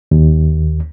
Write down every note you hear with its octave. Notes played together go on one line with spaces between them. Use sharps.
D#2